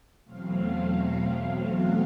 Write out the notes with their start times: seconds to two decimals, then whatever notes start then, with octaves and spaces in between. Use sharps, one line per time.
0.24 E2 B2 F#3 A3 C4 F5
1.69 F#5